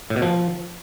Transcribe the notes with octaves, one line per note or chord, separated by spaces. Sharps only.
A2
B2
F3